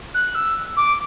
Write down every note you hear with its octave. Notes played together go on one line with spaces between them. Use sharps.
F#6
E6
D6